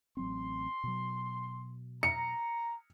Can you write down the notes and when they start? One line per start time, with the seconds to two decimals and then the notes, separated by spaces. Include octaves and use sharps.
0.17 A1 F#3 C4 C6
0.84 B2 F#3
2.03 A#5 C#7